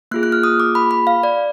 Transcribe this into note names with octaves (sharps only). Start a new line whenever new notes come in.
A#3 F4 G#4 F#6
F#6
F6
D#6
D6
B5
B5
F5
D5